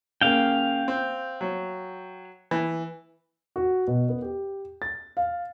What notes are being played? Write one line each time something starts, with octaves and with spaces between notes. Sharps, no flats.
C#3 A#3 F5 G5
C4
F#3
E3
F#4
B2
B3
G4
A6
F5